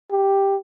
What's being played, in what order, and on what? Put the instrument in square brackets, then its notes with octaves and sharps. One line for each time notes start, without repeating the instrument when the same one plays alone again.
[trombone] G4